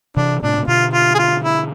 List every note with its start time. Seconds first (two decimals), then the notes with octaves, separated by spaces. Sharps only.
0.17 C3 E3 D4
0.42 A2 C3 D4
0.58 C3
0.68 B2 D3 F4
0.93 F4
1.15 G#4
1.18 F4
1.43 E4